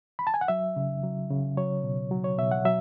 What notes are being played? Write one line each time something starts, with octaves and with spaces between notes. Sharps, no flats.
B5
A5
G#5
F#5
F#3 E5
C#3
F#3
C#3
F#3 C#5
B2
F#3
C#5
B2 E5
F#5
F#3 E5